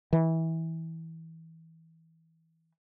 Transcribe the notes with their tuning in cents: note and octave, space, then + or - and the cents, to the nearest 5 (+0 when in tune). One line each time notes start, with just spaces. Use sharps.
E3 -20